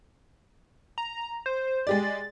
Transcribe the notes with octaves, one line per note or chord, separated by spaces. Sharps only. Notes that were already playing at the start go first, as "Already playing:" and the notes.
A#5
C5
G#3 G4 D5 A6